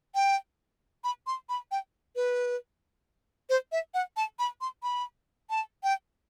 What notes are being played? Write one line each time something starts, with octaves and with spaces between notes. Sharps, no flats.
G5
B5
C6
B5
G5
B4
C5
E5
F#5
A5
B5
C6
B5
A5
G5